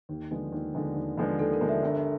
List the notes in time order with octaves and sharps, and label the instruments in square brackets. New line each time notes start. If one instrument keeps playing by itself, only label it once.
[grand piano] D#2
D3 F3 G#3 B3
D#2
D3 F3 G#3 B3
D#2
D3 F3 G#3 B3
[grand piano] D#2 [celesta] A4
[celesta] A#4
[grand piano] D3 F3 G#3 B3
[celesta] E5
[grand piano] G1